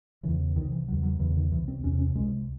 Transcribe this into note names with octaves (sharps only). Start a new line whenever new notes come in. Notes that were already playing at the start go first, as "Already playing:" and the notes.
E2 C#3 E3
C2 C3 D#3
E3
E2 C#3 F#3
F#3
E2 C#3 E3
D#3
C2 C3 E3
C4
E2 C3 C#4
C#4
C2 C3 G#3